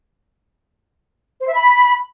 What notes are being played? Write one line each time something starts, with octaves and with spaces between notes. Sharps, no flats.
C5
E5
B5